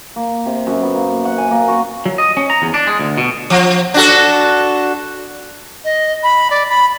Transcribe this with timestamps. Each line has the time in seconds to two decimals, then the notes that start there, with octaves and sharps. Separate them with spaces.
0.16 A#3
0.46 C3
0.67 F#2
0.83 B3
0.95 A#3
1.25 F#5
1.38 G#5
1.51 A#3
1.68 F#4
2.06 F#3
2.18 D#5
2.37 C#4
2.50 A#5
2.62 E2
2.74 D4
2.87 G#3
2.99 D2
3.18 B2
3.50 F3
3.94 D4 F#4 A4
5.84 D#5
6.23 B5
6.51 D5
6.69 B5